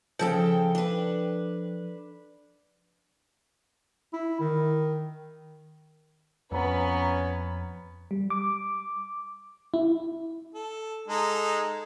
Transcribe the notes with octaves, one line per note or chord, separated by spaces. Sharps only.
C#3 F3 A4 G5
D4 B4
E4
D#3
F2 B3 C#4 B4 A#5
G3
D6
E4
A4
G#3 D#4 A4